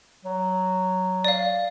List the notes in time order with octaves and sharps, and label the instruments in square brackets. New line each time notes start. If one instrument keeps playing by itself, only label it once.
[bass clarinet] F#3
[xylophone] D5 F5